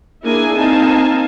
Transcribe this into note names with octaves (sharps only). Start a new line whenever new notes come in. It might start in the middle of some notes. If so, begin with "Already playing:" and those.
A#3 D4 E4 G#4 D5 G#5
A#3 C4 D#4 F5 G#5 A5